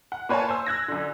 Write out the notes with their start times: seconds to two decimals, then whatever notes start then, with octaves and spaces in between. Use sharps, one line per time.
0.12 F#5
0.29 A#3 B4 C#5 G#5 A5
0.49 C5 G#5 E6
0.66 E6 F#6 G#6 A#6
0.88 F#2 D3